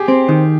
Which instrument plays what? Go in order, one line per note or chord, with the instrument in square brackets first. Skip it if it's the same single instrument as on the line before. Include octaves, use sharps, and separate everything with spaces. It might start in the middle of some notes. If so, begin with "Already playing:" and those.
Already playing: [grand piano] G4 G#4
[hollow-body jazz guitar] C4
D#3